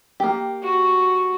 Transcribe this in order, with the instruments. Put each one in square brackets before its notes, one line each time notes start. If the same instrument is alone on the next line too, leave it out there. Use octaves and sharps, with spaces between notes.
[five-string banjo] A#3 G4
[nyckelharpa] F#4